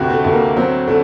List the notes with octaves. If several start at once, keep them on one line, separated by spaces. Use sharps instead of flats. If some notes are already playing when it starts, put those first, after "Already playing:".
Already playing: D2 C3 F#4 G4
A3
D2
A#3
F#3 C4
D3 A3